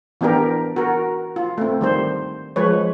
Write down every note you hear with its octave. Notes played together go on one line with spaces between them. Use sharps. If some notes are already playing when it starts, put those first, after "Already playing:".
E3 B3 D4 G4 A#4
F#4 A#4
F4
A3 C4
D#3 G3 C5
F3 G#3 B4 C#5